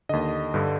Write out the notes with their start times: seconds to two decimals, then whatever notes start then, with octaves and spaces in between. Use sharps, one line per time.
0.09 D#2 D3 D#5
0.54 G2 D3